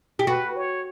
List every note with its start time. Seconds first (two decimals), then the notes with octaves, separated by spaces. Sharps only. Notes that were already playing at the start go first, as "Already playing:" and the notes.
0.19 G4
0.27 F#4 B4
0.56 C#5